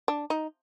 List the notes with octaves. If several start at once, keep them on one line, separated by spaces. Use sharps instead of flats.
D4
D#4